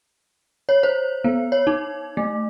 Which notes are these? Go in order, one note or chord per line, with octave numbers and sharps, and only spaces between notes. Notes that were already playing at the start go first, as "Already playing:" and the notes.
C#5
C5
B3
C#5
D#4
A3